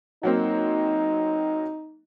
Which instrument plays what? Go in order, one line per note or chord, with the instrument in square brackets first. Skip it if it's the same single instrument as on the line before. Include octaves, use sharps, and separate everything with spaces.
[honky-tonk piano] F#3 A#3 C4 [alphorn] D#4